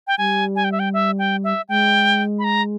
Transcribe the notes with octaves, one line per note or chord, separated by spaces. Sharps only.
G5
G3 G#5
G#5
G5
E5
G5
E5
G5
E5
G#3 G5
B5
A#5